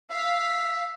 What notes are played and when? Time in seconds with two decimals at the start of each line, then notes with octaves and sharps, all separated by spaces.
0.10 E5 F5 B6